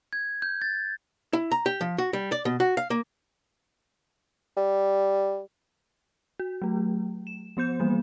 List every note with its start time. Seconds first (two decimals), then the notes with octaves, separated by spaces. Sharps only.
0.13 G#6
0.42 G6
0.62 A6
1.33 E4
1.52 A#5
1.66 G4
1.81 F3
1.98 F#4
2.13 G3
2.32 D5
2.45 B2
2.60 F#4
2.77 F5
2.90 A#3
4.57 G3
6.39 F#4
6.62 F#3 A3
7.27 E7
7.57 F3 B3 C5 G6 E7
7.80 E3 G3 A#3